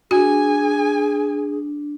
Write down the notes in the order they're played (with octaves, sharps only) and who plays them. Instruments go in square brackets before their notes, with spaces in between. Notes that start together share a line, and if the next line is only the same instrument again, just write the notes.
[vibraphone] D4 [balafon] F#4 [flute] G#4 [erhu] G#5